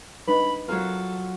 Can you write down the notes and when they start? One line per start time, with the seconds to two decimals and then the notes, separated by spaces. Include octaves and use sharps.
0.28 D4 D#4 B4 B5
0.68 F#3 C4 F4 A4 A#4